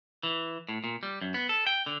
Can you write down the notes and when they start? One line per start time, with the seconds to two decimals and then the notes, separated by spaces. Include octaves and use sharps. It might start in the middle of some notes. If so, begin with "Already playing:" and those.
0.23 E3
0.69 A2
0.84 A#2
1.03 G3
1.21 F#2
1.34 B3
1.49 A4
1.67 G5
1.86 D3